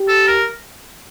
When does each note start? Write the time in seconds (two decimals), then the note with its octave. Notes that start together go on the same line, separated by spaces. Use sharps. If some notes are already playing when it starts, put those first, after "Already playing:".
Already playing: G4
0.08 A4
0.27 A#4